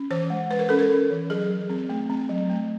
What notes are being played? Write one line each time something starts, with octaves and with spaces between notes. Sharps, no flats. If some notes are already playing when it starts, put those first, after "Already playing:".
Already playing: C#4
E3 C5
G#3
G#3 B4
A#4
C#4 A4
A#4
C#4
E3
F#3 G#4
F#3
C4
A3
C4
F#3
A3